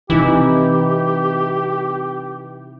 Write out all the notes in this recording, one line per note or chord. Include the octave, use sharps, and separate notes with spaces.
C3 E3 D#4 E4 G4